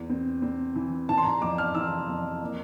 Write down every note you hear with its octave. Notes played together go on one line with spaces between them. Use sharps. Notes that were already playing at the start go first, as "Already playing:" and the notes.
Already playing: E2
C4
C4
E3
E3 A5
C6
A#5
F2 D6
F6
E3 E6
F2
A#3